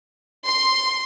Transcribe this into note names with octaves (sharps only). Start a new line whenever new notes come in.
C6